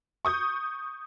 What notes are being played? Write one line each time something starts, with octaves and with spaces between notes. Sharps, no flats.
C#6 D#6 G6